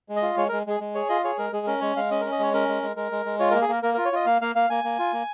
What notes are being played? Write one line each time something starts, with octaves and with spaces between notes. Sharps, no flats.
G#3
D#5
F4
G#3 C#5
G#3 A#4
G#3 G#4
G#3
G#4 C#5
F4 D#5
G#4 C#5
G#3 A#4
G#3 G#4
C#4 A#4
G#3 C#5
G#3 F5
C#4 D#5
C#4 A#4
D#5
G#3 C#5
C#4 A#4
G#3
G#3
G#3 A#4
G#3
G#3
F4 C#5
A#3 A#4
G#4
A#3 A#4
A#3 A#4
F4 A#4
C#5
F4 D#5
A#3 F5
A#3 F5
A#3 F5
A#3 G#5
A#3
F4
A#3